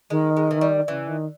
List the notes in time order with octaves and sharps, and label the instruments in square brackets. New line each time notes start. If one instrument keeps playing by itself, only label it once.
[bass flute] D#3 [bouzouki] G#3
[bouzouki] G#3
E3
G3
[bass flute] C#3 [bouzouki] E3
[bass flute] D#3